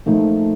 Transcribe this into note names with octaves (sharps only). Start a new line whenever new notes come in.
A#2 F3 A3 D#4